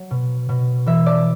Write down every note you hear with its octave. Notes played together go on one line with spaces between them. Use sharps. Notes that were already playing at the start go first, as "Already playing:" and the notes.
Already playing: F#3
B2
B2
E3 E5
D5